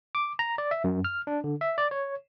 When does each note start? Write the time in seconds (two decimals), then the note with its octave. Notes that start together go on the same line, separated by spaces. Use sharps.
0.15 D6
0.39 A#5
0.58 D5
0.71 E5
0.84 F#2
1.05 F6
1.27 D4
1.44 D3
1.61 E5
1.78 D5
1.91 C#5